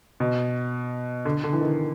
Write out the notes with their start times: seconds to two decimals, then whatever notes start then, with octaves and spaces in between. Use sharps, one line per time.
0.20 B2
1.25 D3
1.44 D3
1.53 E3
1.61 D#3